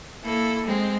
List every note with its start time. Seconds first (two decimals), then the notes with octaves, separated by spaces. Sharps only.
0.23 A#3 E4 A4
0.63 G#3 C4